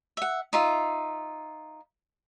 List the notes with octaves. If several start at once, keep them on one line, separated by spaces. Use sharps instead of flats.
E5 F#5
D#4 F4 E5